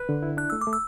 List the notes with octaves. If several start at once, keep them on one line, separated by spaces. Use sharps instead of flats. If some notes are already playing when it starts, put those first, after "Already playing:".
Already playing: B4 F#6
D3
E4
D4 F#6
A3 E6
D6
A3
E6